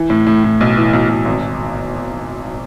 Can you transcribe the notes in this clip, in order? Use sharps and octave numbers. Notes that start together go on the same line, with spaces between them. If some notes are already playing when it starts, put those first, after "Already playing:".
Already playing: E3
A2
A2
A2
B1
E3
B1
B1
G#1